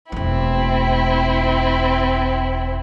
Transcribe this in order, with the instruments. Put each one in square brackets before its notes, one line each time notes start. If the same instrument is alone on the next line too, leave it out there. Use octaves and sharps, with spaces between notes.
[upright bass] E1 A3 [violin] C4 E4